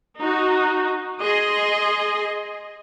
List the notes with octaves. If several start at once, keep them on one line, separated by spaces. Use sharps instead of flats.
D#4 F#4
G#4 D#5 C6